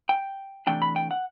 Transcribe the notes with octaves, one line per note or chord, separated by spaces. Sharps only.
G5
C3 E3 A3 D4 G5
B5
G5
F#5